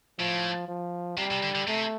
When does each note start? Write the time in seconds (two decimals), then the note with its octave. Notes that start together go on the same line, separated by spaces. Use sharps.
0.19 A2 F3
0.68 F3
1.18 C3 G3
1.31 C3
1.43 D3
1.55 D3
1.67 C3 A3